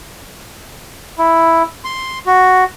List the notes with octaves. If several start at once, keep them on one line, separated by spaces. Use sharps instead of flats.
E4
C6
F#4